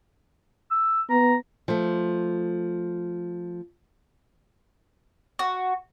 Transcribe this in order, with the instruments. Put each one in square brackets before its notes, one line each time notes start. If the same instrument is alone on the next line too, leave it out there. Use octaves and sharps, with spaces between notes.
[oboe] E6
[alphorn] B3 [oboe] A#5
[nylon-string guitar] F3 A3
[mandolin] F#4